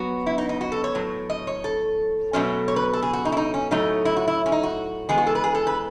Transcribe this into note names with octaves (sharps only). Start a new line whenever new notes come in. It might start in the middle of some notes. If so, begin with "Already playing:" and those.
Already playing: F#3 B3 F#4
E4
D#4
D#4
F#4
A4
C#5
A2 F#3
D#5
C#5
A4
B2 F#3 A3 C#4
C#5
B4
A4
G#4
F#4
D#4
E4
D#4
C#4
A2 F#3 A3 C#4 D#4
E4
F#4
E4
C#4
D#4
F#4
E3 G#3 B3 G#4
F#4
A4
B4
G#4
A4
B4